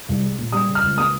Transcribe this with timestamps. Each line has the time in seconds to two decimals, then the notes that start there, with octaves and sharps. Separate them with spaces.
0.09 C2
0.23 G#3
0.39 A#2
0.52 G3 D#6
0.67 C#3
0.75 F6
0.83 C#2
0.97 A#3 D#6